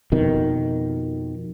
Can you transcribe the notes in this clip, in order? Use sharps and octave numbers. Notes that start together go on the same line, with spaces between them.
F2 B2 D#3